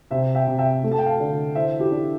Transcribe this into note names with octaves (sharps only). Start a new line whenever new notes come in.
C3 C5 E5
E5 G5
C3
E5 G5
A3
A5
G5
F5 A5
D3
E3 C5 E5
E4 G4
D4